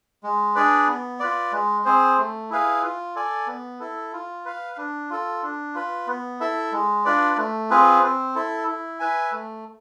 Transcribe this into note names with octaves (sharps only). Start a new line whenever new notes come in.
G#3
D4 G#4 B4 D5
B3
F4 B4 D5
G#3
C4 G#4 C5
A3
E4 G#4 B4 F5
F4
A4 D5 G#5
B3
E4 A4
F4
B4 F5
D4
F4 A4
D4
F4 B4
B3
E4 A4 E5
G#3
D4 F4 B4 D5
A3
C4 F4 G#4 B4
C4
E4 A4
E4
B4 E5 G#5
A3